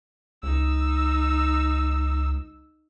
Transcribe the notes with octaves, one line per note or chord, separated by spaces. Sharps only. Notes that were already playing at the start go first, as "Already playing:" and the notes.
C#2 D#4 E6